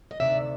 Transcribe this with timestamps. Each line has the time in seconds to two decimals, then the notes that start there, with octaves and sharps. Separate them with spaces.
0.11 D#5
0.20 D2 C3 D#3 D5 E5